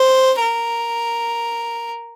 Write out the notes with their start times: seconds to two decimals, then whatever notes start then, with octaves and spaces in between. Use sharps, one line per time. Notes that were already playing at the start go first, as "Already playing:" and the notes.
Already playing: C5
0.41 A#4